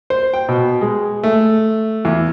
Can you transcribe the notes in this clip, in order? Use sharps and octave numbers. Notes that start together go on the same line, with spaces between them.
C5
G5
B2
G#3
A3
E2